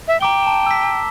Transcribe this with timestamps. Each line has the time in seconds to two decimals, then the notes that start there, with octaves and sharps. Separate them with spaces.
0.08 E5
0.21 G5 A#5 D6 G7
0.43 A5 E7
0.66 E6 B6